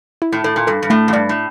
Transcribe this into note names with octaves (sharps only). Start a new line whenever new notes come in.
E4
A2
A2 A4
A#2
G2 A4
G2
A2 A3
F2
G2 D5
A2